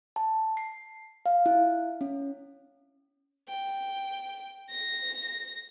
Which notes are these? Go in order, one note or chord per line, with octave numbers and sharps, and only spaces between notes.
A5
C7
F5
E4
C#4
G5
A#6